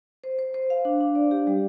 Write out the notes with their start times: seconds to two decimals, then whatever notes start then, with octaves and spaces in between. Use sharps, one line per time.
0.24 C5
0.39 C5
0.54 C5
0.70 F5
0.85 D4
1.01 D4
1.15 D5
1.31 G4
1.47 G3